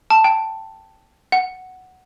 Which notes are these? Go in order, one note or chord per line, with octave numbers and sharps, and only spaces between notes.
A5
G5
F#5